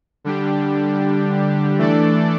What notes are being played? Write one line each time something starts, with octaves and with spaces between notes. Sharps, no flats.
D3 G3 D4 G4
E3 A3 D4 A4 D5